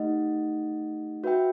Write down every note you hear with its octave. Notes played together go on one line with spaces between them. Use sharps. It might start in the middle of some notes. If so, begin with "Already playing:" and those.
Already playing: A3 D#4 G4 D#5 F#5
F#4 B4 E5 G5